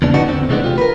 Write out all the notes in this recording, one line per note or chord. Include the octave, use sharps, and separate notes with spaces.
E2 A#2 C#3 D4
D3 E3 B3 D4 D#4 F#4
E2 D3 C4
C3 E3 G#3 A3 B3 D4
F4 G4
A#4 B4